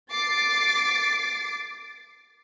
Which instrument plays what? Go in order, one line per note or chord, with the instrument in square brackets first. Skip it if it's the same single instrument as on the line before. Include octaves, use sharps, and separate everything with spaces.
[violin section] D6 A6 C7